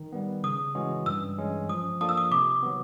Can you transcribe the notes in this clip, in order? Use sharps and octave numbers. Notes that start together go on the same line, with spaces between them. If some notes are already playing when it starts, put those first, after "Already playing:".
Already playing: D#3
G3 B3
C#3 D#6
E3 G#3 C#4 F#4
G2 E6
E3 G#3 C#4
F3 D#6
A#3 D4 F4 A4 D#6
E6
D#6
C3 D6
D#3 F#3 B3